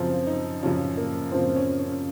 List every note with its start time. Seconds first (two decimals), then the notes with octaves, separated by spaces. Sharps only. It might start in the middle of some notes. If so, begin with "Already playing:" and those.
Already playing: F#2 C#3 F3 C4
0.27 D#4
0.63 F#2 C#3 F3 C#4
0.97 A#3
1.32 F#2 C#3 F3 C4
1.56 C#4
1.79 C#4